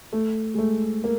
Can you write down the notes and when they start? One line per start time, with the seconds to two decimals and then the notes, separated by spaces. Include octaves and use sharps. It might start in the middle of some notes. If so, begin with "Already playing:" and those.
0.13 A3
0.54 G#3
0.58 A3
1.04 A#3